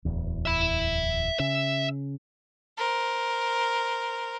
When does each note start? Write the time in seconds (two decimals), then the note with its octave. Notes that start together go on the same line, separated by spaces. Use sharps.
0.05 D1 E2
0.46 E5 B5
1.40 C#3 E5
2.78 A#4 C5